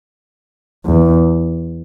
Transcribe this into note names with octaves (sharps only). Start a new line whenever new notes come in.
E2